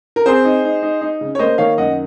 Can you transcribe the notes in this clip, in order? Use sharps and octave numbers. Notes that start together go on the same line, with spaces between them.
A#4
C4 G#4 C5
D#4
D#4
D#4
D#4
C#3
C#5
A#3 C5 D#5
D#3 C#5 F5
F#2 D#5 F#5